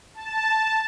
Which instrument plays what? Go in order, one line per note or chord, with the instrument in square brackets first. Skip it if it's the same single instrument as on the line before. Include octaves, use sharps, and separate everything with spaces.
[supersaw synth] A5